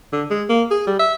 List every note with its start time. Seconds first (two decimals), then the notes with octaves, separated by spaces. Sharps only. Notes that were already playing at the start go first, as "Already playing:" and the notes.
0.12 D3
0.30 G#3
0.49 A#3
0.71 G#4
0.87 G3
0.99 E5